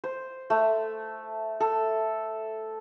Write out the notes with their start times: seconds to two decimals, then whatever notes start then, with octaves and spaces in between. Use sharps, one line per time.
0.04 C5
0.50 A3
1.60 A4